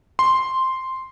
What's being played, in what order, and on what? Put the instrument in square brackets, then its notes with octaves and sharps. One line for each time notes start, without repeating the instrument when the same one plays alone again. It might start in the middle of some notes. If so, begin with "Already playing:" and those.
[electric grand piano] C6